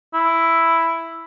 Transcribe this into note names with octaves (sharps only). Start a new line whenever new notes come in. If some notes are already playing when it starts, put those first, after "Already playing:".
E4